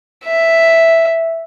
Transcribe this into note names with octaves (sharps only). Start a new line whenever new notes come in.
E5